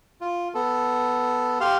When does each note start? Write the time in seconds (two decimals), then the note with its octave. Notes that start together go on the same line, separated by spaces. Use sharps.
0.21 F4
0.54 B3 A4
1.61 G4 F5 C6 F6